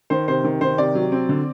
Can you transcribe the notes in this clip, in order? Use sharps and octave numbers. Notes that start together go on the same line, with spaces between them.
D#3 C5
C3 C5
D#3
D#3 C5
C3 D5
F#3
C4
D3